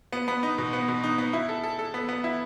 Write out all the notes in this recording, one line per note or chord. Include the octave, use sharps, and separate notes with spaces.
B3
B3
D#4
B2
B3
B2
D#4
B3
E4
A4
A4
A4
B3
B3
E4